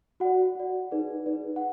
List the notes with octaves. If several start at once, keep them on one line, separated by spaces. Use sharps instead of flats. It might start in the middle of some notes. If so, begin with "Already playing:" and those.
F#4 D5 F#5
F#4 D5
D#4 G#4 B4 D5
D#4 G#4 B4 D5
F#5